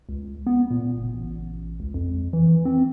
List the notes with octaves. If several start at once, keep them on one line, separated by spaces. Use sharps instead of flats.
C#2
B3
A#2
F#1
A1
C#2
F2
E3
C4